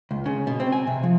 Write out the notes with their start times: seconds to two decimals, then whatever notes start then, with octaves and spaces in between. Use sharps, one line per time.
0.11 C#2
0.26 C#3
0.47 B2
0.60 C4
0.72 G#5
0.87 C3
1.03 F3